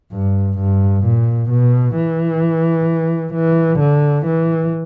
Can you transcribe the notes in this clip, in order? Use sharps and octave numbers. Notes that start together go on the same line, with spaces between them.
G2
G2
A#2
B2
E3
E3
D3
E3